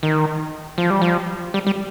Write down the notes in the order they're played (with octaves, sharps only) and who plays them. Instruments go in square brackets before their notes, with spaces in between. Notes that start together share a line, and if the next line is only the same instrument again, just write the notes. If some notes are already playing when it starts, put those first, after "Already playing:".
[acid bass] D#3
F3
G3
F3
G3
G3